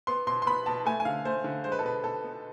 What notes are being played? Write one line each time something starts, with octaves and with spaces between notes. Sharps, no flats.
B3 C6
B2 C6
C6
B3 B5
B2 A5
A3 G#5
G#5
D3 F5
A3 C5
D3
G#3 C5
B4
A4
B2 B4
B2 A4
B3